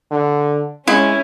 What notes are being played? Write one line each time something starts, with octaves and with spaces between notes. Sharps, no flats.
D3
G#3 C#4 E4